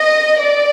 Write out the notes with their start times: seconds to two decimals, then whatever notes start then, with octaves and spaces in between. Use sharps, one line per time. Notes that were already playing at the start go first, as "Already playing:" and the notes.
Already playing: D#5
0.40 D5